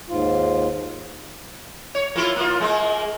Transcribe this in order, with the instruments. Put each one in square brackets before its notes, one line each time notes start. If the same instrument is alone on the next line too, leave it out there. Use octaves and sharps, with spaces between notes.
[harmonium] D#2 G#2 F4
[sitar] C#5
A#3 E4 F4
A#3 F4
G#3 A#3